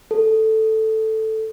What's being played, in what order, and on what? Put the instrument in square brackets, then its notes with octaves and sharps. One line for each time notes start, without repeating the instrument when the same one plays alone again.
[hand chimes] A4